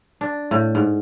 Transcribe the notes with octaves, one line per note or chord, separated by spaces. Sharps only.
D4
A2
G#2